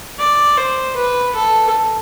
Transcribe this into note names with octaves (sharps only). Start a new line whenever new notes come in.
D5
C5
B4
A4